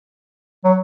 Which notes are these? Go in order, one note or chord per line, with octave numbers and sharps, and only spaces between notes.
F#3